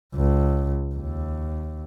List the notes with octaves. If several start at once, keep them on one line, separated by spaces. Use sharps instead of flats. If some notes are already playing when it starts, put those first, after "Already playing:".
C#2
D#2